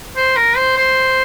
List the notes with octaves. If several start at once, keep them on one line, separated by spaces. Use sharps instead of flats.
C5
A#4
C5
C5